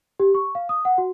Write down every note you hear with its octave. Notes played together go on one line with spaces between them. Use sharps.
G4
C#6
F5
D#6
F#5
F#4